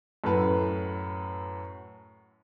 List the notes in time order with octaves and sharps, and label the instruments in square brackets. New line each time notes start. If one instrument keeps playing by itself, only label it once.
[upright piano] F#2 A2 A4 B4